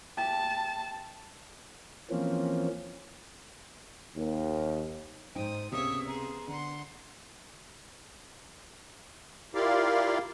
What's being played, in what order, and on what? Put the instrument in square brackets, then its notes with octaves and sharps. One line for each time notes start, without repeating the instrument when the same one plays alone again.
[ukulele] E4 G4 [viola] A5
[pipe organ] E3 F3 A#3 C4 C#4
[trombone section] D#2
[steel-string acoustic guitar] G#2 G5 [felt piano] D#4 [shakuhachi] C5 [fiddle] D#6
[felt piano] C#2 C3 [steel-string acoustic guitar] B3 A#4 [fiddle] C#5 E5 [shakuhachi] D#6
[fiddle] G#4 C5 [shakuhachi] A#5
[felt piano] D3 [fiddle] F#5 C6
[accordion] E4 F4 G4 A#4 D5 F5